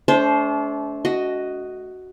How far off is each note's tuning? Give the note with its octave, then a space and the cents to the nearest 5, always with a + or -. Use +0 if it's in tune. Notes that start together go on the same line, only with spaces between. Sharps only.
A3 -30 D4 -40 C5 +0
F#4 +5 D#5 +0